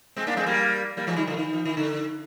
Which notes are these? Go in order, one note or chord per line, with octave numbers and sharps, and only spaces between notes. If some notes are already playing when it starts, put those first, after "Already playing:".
G#3 C4
A#3 D4
G#3 C4
G3 A#3
G3 A#3
F3 G#3
D#3 G3
D3 F3
D#3
F3
D#3
D3